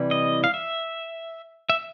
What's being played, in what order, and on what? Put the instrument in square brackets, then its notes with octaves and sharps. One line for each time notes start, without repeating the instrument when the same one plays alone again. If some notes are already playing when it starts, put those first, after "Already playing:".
Already playing: [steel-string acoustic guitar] C3 E3 G3
[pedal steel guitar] D#5
F5
E5
E5